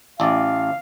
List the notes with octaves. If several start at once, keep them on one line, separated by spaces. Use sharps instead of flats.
A1 D5 F5